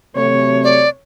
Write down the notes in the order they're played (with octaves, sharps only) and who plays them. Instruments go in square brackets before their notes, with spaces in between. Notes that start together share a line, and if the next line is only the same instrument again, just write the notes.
[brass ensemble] C3 F#3 A3 [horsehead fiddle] C#5
[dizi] D5